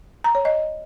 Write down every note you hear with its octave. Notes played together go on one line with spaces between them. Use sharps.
A#5
C#5
D#5